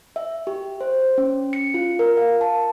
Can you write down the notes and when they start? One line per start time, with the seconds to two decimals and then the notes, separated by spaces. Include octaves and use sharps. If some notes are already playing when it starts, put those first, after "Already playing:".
0.16 E5
0.47 G4
0.81 C5
1.18 C#4
1.53 C#7
1.74 F4
1.99 A#4
2.17 F5
2.41 A5